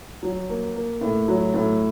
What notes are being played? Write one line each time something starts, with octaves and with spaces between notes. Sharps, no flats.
F#3
A#3
A#3
A2
F#3
A2